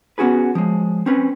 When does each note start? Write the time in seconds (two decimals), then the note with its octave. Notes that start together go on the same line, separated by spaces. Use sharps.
0.18 B3 C#4 F#4 G#4 B4
0.55 F3 G#3
1.06 C4 C#4 B4